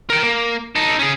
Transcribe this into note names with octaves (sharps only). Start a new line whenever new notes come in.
A#4 G5
A#3
D#4 A4
C#4 G#4